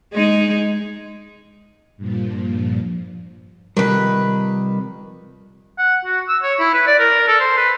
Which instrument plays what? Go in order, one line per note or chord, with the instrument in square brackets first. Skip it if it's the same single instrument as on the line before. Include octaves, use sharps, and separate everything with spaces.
[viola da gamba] G#3 D#4 G#4
[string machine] G2 A#2 F3
[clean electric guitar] C3 F3 G3 [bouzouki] D#3 B4
[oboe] F#5
F#4
E6
C#5
E4
B4
D5
A#4
A4
C5
B4